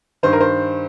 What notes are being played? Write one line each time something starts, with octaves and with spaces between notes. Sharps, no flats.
G2 D#3 C5
A#4
C5